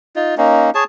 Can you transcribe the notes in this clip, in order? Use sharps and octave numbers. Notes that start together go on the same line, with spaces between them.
D#4 F4
A#3 C#4 D#4
G#4 C#5 A5